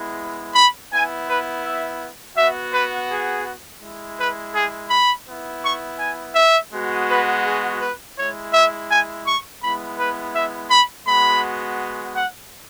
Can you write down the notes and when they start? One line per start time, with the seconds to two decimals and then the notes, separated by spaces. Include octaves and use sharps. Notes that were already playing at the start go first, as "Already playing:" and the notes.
Already playing: G#3 B3 E4
0.55 B5
0.92 B3 E4 G#5
1.29 B4
1.65 E5
2.37 B3 F#4 E5
2.73 B4
3.10 G#4
3.82 G#3 E4
4.18 B4
4.55 G#4
4.90 B5
5.27 B3 E4
5.63 C#6
5.99 G#5
6.35 E5
6.72 G#3 B3 F#4
7.08 B4
7.45 G#4
7.81 B4
8.17 G#3 E4 C#5
8.54 E5
8.89 G#5
9.26 C#6
9.62 G#3 B3 E4 B5
9.99 B4
10.34 E5
10.71 B5
11.07 G#3 B3 F#4 B5
12.16 F#5